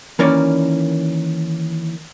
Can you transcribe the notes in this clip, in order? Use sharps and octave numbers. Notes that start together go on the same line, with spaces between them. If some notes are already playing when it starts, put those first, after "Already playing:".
D#3 E3 A#3 C#4 D5